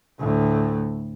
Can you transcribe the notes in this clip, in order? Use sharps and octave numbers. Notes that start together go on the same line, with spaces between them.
D2 A2